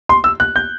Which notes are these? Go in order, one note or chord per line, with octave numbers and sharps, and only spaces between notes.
C6
E6
F#6
G6